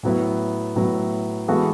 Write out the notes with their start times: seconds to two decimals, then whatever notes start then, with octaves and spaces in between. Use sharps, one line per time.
0.03 A2 F#3 B3 E4
0.76 A2 F#3 B3 E4
1.48 E3 G#3 B3 F#4 A4